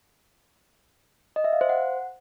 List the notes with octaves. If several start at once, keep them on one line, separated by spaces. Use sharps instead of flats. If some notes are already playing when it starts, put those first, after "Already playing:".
D#5
E5
F5
C5
F#5